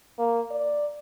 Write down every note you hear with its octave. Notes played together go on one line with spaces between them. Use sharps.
A#3
D5